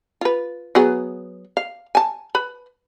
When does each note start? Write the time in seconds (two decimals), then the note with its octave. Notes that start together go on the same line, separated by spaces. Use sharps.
0.21 F4 B4
0.75 F#3 B3 G#4
1.57 F5
1.95 G#5 A5
2.35 B4 B5